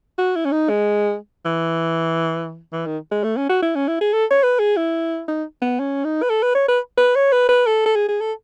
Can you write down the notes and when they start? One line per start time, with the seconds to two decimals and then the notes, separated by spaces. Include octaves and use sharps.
0.18 F#4
0.36 E4
0.45 C#4
0.52 D#4
0.69 G#3
1.46 E3
2.73 E3
2.86 D#3
3.12 G#3
3.24 A3
3.37 C#4
3.49 F#4
3.63 E4
3.75 C#4
3.88 E4
4.01 G#4
4.13 A4
4.31 C#5
4.44 B4
4.60 G#4
4.77 E4
5.28 D#4
5.62 B3
5.79 C#4
6.04 D#4
6.23 B4
6.30 A4
6.43 B4
6.55 C#5
6.68 B4
6.98 B4
7.16 C#5
7.32 B4
7.49 B4
7.66 A4
7.86 A4
7.96 G#4
8.09 G#4
8.21 A4